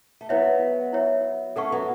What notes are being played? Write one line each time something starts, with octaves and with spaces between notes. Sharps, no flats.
A3
F#3 B3 E4 C#5 E5
E4 C#5 E5
A3 C#4 A4 F#5 C#6
F#3 B3